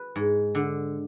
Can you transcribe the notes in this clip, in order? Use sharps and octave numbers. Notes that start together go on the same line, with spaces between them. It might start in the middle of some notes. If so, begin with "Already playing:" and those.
Already playing: B4
G#2
D3